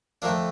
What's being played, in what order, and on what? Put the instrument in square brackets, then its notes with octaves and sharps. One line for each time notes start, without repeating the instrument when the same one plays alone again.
[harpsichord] F2 D3 A3 A#3 D4